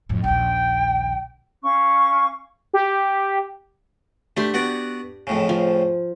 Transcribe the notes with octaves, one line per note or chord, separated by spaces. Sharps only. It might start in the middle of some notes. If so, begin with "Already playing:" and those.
F2 A2
A#1 D#2 G5
C#4 F5 C#6
G4
A3 D4 G4 C6
B3 F#4 D5
F2 A2 C#3
F3